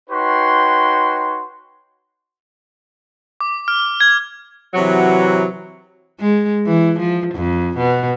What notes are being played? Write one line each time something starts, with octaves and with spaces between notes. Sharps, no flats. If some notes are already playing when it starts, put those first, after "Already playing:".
D#4 F#4 B4 C#5 G5 C6
D6
F6
G#6
C3 E3 F#3
G#3
E3
F3
F2
B2